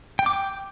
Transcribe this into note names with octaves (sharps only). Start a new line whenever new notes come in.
G5
D6
G5